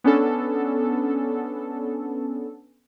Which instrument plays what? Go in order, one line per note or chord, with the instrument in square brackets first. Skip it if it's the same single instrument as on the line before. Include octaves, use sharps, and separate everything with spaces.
[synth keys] B3 C#4 D4 A4